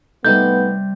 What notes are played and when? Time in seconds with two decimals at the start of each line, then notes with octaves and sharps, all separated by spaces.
0.25 C3 G3 A3 B3 D#4 G6